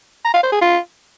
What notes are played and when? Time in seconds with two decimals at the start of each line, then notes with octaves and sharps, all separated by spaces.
0.25 A#5
0.34 F5
0.43 C5
0.52 G#4
0.61 F4